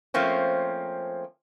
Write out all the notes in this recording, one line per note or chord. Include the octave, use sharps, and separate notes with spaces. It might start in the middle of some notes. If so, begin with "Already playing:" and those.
F3 A3 A#3 C4 C#4